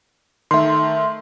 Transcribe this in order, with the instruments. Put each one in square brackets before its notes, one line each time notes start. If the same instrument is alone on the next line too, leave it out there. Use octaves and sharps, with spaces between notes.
[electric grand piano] D#3 A3 [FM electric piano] E5 C6